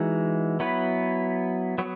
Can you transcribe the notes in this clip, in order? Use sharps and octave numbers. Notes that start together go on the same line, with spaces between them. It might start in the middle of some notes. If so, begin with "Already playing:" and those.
Already playing: E3 G#3 D#4 F#4
F#3 B3 E4 B4
F#3 B3